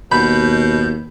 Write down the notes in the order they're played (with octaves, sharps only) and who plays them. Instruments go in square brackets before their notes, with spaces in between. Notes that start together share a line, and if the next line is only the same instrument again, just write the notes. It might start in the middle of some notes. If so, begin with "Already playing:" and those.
[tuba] D#2 [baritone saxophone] B2 [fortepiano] B5 [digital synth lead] G6